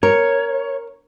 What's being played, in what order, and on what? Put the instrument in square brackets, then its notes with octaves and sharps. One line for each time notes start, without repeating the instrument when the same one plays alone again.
[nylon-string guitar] A#4 [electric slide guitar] C#5